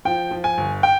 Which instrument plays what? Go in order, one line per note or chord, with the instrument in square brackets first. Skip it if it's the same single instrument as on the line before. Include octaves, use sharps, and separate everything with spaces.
[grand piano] F3 G5
F3
G#5
G1
G5